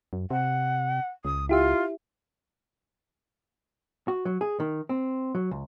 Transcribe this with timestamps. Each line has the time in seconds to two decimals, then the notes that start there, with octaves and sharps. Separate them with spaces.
0.13 F#2
0.30 C3 F#5
1.25 C#2 D#6
1.49 E4 F4 G4 E5
4.08 F#4
4.25 F#3
4.41 G#4
4.60 D#3
4.89 C4
5.35 F#3
5.51 C#2